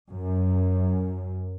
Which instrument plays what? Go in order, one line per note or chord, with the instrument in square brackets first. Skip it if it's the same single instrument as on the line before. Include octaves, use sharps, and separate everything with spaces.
[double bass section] F#2